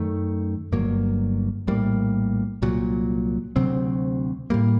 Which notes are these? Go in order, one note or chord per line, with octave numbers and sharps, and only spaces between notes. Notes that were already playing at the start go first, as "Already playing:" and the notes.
Already playing: F#2 D#3 A3
G1 G2 F#3 A#3
A#1 A2 G3 A#3
C2 A#2 F#3
D2 C3 F#3 C4
A2 G3 A#3